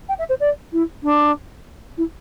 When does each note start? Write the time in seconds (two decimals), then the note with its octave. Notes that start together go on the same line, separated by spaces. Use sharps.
0.09 G5
0.19 E5
0.29 C5
0.40 D5
0.72 E4
1.03 D4
1.97 E4